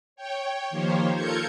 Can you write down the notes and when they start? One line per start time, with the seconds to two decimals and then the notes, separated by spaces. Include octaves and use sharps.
0.16 C#5 G5
0.70 D#3 F3 A#3 G4 C5 C#5
1.13 F4 A4 A#4 G6 G#6 C#7